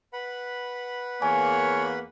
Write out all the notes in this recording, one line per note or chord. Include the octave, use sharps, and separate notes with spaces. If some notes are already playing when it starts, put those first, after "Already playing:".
B4 F#5 B5
E2 A#3 C#5 G#5